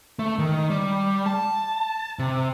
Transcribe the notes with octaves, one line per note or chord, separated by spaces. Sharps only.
A3
D#3
G3
A5
C3